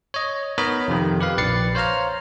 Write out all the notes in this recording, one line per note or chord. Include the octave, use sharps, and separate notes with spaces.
C#5 D#5
B3 D#4 A#4 C#5 D#5 B5
F2 C3 D#3
G4 B4 F5
A#1 B4 D5 A6 C7 C#7
C5 C#5 F5 A#5 F6